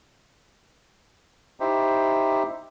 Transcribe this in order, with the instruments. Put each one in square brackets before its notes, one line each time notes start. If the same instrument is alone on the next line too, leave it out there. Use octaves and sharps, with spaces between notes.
[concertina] D#4 E4 G4 C5